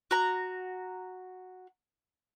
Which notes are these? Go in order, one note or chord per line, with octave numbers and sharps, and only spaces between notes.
F#4 A#5